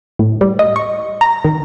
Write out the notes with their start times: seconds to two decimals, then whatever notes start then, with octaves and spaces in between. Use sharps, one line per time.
0.19 A2
0.41 G3
0.59 D#5
0.76 C#6
1.21 A#5
1.45 D#3